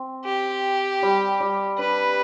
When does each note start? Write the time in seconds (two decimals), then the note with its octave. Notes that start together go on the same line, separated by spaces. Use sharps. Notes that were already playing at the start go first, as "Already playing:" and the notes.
Already playing: C4
0.25 G4
1.02 G3
1.40 G3
1.78 D4 B4